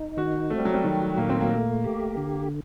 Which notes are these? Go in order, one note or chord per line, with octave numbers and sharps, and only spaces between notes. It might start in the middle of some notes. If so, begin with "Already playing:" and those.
Already playing: D#4
D#3 F#4
A3 C4
G3
F#3
G3
D#3 F#3
A#2 A#3
C4
A#3
A3
G4
D3